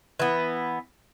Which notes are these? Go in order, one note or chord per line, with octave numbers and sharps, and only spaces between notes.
E3 B3